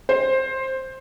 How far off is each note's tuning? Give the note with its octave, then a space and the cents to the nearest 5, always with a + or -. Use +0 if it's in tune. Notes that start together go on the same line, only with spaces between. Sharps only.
C5 +10